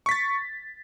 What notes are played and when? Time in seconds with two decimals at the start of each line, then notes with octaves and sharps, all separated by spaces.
0.06 C#6
0.09 B6
0.11 A6